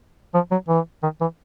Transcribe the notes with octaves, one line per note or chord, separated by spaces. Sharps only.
F3
F#3
E3
D#3
E3